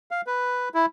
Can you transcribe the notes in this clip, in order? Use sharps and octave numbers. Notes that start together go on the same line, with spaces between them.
F5
B4
E4